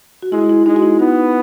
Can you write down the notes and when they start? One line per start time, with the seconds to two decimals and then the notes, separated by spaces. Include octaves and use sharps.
0.22 F#4
0.32 G#3 E4
0.50 E4
0.66 G#3 D#4
0.76 F#4
0.82 E4
0.99 B3 D#4